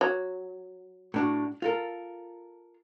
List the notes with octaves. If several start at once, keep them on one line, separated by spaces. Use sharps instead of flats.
F#3
A2 D4 F#4
F4 A4 A#4